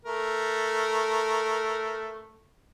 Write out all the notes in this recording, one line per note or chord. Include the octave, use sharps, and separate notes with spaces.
A3 A#4